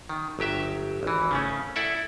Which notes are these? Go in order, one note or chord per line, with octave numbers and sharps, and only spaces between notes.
D#3
G1 F#3 G4 E5
G#1 E3
C#3 A3 C#4
E4 A4 D5 E5 F#5